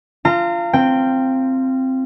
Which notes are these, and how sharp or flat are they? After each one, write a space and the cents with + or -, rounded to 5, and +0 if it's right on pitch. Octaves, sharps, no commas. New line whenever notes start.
F4 -20 A#5 -40
C4 +0 G5 +0